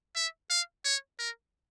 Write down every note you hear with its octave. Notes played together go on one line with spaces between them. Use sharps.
E5
F5
C#5
A#4